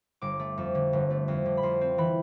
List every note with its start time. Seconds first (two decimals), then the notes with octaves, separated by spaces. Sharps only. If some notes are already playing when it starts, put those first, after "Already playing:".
0.21 G1 D6
0.40 A3
0.58 F2
0.75 D3
0.93 G1
1.10 A3
1.28 F2
1.46 D3
1.57 B5
1.63 F2 C6
1.81 C4
1.98 E3 B5